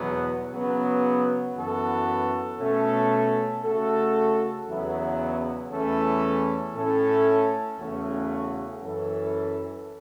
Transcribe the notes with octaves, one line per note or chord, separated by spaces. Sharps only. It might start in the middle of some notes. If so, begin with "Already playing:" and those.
Already playing: E2 B2 F#3 B3 F#4
C#3 F#3 B3
F#2 E3 B3 F#4 A4
B2 A3 C#4 A4
C#3 A3 F#4 A4
E2 C#3 F#3 B3 E4
E2 E3 A3 C#4 A4
A2 A3 C#4 A4
E2 C#3 A3 C#4 F#4
F#2 E3 C#4 A4